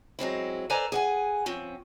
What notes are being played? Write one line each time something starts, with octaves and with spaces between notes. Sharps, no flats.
F#3 G#3 C4 E4
A4 B4 C5 D5 G#5 A#5
G#4 F#5 G#5
F3 C4 C#4